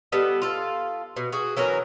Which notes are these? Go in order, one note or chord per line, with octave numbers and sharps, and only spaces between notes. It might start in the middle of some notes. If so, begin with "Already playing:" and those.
G3 B3 A4 D#5
F4 A4
B2
F#4 G#4
E3 F#3 C#4 A#4